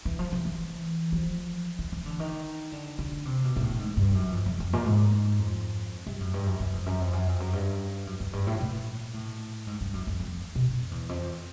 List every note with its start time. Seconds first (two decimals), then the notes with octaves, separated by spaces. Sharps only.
0.05 E3
0.19 F3
0.32 E3
0.45 E3
1.12 F3
1.79 E3
1.92 E3
2.06 D3
2.20 D#3
2.72 D3
2.98 D3
3.25 C3
3.44 B2
3.56 A#2
3.61 A2
3.79 G#2
3.97 G2
4.15 F#2
4.32 F2
4.46 F2
4.60 F2
4.73 A#2
4.86 G#2
5.39 F2
6.07 G2
6.20 F#2
6.34 G2
6.46 F#2
6.60 F#2
6.73 F2
6.86 F#2
7.00 F2
7.13 F#2
7.27 F2
7.40 F#2
7.53 G2
8.07 F#2
8.20 F#2
8.33 G2
8.47 A2
8.61 A#2
9.14 A2
9.67 G#2
9.81 G2
9.93 F#2
10.07 F2
10.20 F2
10.55 B2
10.74 F2
10.91 E2
11.09 F2